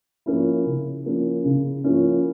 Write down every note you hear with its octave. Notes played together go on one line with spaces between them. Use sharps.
F3 A#3 C#4 E4
C#3
F3 A#3 C#4 E4
C#3
F3 A#3 C#4 E4